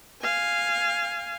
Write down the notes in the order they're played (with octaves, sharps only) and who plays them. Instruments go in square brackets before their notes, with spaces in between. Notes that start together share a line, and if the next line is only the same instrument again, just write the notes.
[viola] F5 G#5